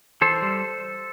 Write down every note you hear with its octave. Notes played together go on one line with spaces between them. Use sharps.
E3 A4 C5
G3